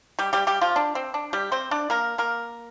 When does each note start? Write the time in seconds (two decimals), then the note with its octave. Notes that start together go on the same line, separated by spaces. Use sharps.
0.19 G3 G4
0.33 G3 G4
0.47 G3 G4
0.61 F3 F4
0.76 D4
0.95 C4
1.14 D4
1.33 G3 G4
1.52 C4 C5
1.71 D4 D5
1.90 A#3 A#4
2.18 A#3 A#4